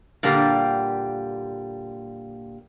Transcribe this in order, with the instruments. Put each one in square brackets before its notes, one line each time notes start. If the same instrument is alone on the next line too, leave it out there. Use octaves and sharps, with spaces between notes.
[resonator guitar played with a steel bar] A#2 D3 G3 A#3 G4